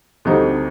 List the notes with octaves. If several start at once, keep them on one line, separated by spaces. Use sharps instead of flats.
D2 D3 G3 C4 D#4